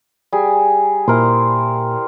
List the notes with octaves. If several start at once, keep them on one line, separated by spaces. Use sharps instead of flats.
G3 G#4
A#2 E4 A#4 C5